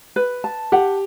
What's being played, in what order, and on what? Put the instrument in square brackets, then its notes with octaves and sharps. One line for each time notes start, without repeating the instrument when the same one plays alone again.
[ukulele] B4
A5
[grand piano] G4 [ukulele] F#5